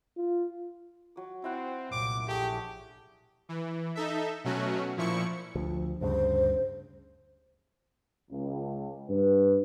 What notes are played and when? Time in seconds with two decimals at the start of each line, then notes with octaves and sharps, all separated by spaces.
0.17 F4
1.16 F#3 D6
1.44 C4 E4 C5 F#5
1.91 C2 F#2 A#2 D6
2.28 A#1 A3 G4 G#4 C#5
3.49 E3
3.95 D#4 A4 E5
4.44 B2 F#3 A3 C#4 F#4
4.97 A#2 F3 E4 C#6 C#7
5.55 D2 F3
6.01 D2 G2 C#3 C5
8.30 C#2
9.08 G2 B4